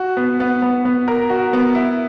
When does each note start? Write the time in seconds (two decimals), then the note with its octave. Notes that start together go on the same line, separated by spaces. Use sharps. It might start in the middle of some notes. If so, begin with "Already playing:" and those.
Already playing: F#4
0.17 B3
0.40 B3
0.62 B3
0.85 B3
1.08 A#4
1.30 F#4
1.53 B3
1.75 E4